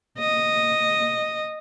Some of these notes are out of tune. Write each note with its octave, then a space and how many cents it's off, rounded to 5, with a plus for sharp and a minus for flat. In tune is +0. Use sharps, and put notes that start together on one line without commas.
D#5 -5